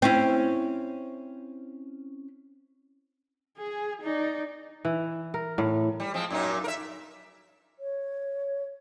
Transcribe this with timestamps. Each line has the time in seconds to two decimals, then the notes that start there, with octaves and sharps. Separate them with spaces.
0.02 C4 C#4 E4
3.58 G#4 G#5
4.02 D#4 D5
4.85 E3
5.34 A#4
5.58 A2
6.00 G3
6.14 F3 G#3 C4
6.30 F#2 A#2 D#4
6.64 A#4 E5
7.79 C#5